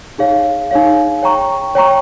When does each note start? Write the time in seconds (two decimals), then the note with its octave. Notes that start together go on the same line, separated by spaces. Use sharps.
0.18 D#4 G#4 C#5 F5
0.71 D#4 G#4 C#5 F5
1.23 C#5 G5 A#5 C#6
1.75 C#5 G5 A#5 C#6